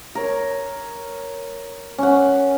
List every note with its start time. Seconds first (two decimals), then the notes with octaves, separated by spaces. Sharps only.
0.15 A#4 C#5
1.98 C#4 F#5